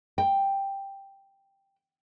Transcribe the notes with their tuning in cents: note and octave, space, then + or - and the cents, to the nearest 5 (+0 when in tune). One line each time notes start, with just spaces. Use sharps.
G5 +5